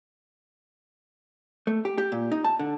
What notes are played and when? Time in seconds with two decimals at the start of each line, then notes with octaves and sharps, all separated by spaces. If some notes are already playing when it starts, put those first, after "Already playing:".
1.67 A3
1.85 G4
1.98 G4
2.12 A#2
2.32 D#4
2.44 A5
2.59 D3